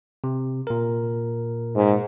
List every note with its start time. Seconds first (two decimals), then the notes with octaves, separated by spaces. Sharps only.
0.24 C3
0.67 A#2 A#4
1.76 G#2